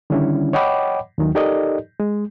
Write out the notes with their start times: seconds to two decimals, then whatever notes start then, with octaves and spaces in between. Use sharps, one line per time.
0.10 D3 D#3 G3 C#4 D4 E4
0.53 C#5 D#5 F#5 G5 B5 D6
1.18 D#2 D#3 F#3
1.35 D#4 G4 A4 A#4 D5 D#5
2.00 G#3